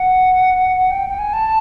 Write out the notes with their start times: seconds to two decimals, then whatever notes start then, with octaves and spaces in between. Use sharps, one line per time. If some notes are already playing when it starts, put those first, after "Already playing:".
Already playing: F#5
0.90 G5
1.09 G5
1.18 G#5
1.32 A5